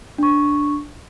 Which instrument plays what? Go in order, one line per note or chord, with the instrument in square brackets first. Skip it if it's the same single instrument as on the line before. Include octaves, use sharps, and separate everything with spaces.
[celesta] D4 C#6